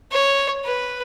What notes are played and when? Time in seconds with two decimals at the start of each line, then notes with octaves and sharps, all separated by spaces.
0.11 C#5
0.64 B4